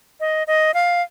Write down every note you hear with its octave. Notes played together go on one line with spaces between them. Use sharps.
D#5
D#5
F5